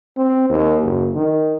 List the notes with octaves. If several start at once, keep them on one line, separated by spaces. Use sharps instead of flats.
C4
D#2
F#1
D#3